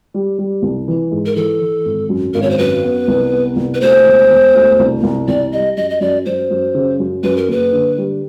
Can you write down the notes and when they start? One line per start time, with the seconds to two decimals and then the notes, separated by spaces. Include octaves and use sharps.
0.14 G3
0.38 G3
0.62 C2
0.88 E3
1.11 G#2
1.26 A#4
1.36 E3 A4
1.61 E3
1.85 G#1
2.09 F#2
2.34 G#1 A#4
2.42 C#5
2.51 C5
2.58 F#2 B4
2.83 B3
3.08 C2
3.32 B3
3.56 C2
3.74 B4
3.81 D2 C5
4.05 E1
4.30 E1
4.54 D2
4.79 C2
5.03 C2
5.28 C2 D5
5.52 G3 D#5
5.77 F#2 D#5
5.90 D#5
6.01 F#2 D5
6.26 F#2 C5
6.51 F#2
6.74 C#3
7.00 F#2
7.24 F#2 B4
7.37 A#4
7.48 F#1 B4
7.73 D3
7.97 G3